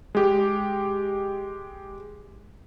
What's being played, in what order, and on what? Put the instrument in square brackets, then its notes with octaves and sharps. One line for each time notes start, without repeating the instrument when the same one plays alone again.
[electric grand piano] G#3 G4